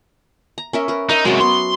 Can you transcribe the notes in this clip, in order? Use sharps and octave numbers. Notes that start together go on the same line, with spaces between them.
A#5
C#4 A#4 E5
A#4 B4
D#4 A#4 E5
C3 F#3 G#3 C#4 F#4
B3 C6